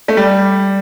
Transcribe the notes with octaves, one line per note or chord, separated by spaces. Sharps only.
A3
G3